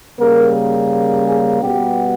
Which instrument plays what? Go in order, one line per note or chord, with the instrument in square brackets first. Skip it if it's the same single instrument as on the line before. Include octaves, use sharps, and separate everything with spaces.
[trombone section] C#3 G3 A#3 A#4
G#4
B2 G3 B3 G4